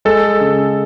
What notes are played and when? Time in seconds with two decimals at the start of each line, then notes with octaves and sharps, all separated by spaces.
0.05 G#3 A4
0.41 C#3